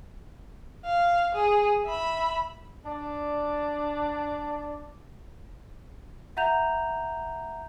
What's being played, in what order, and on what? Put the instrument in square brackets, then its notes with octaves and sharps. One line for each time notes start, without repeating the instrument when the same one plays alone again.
[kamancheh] F5
G#4
E5 B5
[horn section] D4 D5
[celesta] E5 F#5 A#5 G6 F7